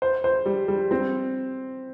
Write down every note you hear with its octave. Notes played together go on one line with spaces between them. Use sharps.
C5
C5
G3
G3
C4